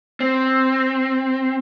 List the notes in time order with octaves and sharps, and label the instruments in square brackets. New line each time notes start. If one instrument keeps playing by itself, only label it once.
[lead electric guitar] C4